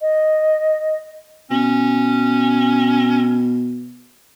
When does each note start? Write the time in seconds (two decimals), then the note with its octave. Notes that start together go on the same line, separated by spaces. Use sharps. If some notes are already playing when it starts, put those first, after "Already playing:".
0.01 D#5
1.51 B2 C#4